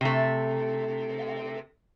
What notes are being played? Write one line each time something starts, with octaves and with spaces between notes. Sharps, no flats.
C3 A3